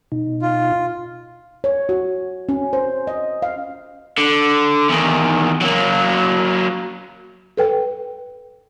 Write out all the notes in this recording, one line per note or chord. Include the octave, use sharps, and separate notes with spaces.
B2 D#4
F4
C#5
F#4
C#4
C5
D#5
F5
D3
E2 D#3
F#3 A#3
A4 B4 G5